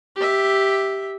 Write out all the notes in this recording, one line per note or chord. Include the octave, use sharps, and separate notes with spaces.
G4 E5